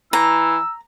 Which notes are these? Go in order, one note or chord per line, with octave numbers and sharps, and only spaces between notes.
E3 A#5 E6